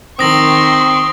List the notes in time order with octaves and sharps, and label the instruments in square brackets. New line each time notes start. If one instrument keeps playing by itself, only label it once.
[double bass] D#3 [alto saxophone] C4 [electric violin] C6 C#6 [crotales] D#6 A#6 F#7